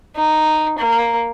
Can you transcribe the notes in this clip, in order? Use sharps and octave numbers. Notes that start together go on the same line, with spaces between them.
D#4
A#3